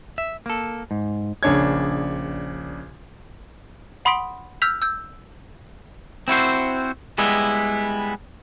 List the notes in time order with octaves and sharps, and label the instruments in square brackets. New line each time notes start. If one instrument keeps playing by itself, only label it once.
[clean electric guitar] E5
A#3 A4
G#2
[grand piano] A#1 C#3 D4 C#5 G#6
[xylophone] F#5 B5 C6 D#6 B6 D7
E6 F6 G6 B6 F7
E6 G6
[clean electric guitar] C4 E4 F#4 C5
G3 G#3 B3 E4